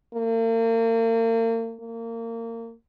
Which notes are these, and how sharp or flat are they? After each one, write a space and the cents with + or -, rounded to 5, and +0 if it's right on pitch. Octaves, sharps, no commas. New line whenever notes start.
A#3 -40
A#3 -25